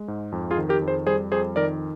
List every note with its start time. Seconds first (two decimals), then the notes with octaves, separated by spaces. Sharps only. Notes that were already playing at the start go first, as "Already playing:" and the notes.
Already playing: G#3
0.08 G#2
0.32 F2
0.51 F4 G#4
0.58 D#3
0.69 G4 A#4
0.82 F2
0.88 G#4 C5
1.07 G3 G#4 C5
1.32 F2 G#4 C5
1.56 D#3 A#4 D5